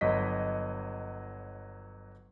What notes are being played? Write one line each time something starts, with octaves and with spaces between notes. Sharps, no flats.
G1 F#3 D#5 B6